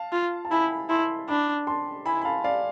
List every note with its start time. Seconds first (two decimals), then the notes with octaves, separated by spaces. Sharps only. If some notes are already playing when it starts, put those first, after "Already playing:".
Already playing: F5 A5
0.13 F4
0.45 A5
0.51 E4 G#5 B5
0.90 E4 A5 C6
1.28 D4 B5 D6
1.67 A5 C6
2.06 E4 G#5 B5
2.22 B5
2.25 F5 A5
2.44 D5 F5